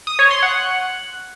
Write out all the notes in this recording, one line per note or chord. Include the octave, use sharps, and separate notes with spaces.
D#6
C#5
C6
F#5